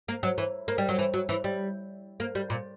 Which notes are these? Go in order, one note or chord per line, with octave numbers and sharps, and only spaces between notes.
A#3
F#3
E3
A#3
G3
F#3
E3
F#3
E3
G3
A#3
G3
A#2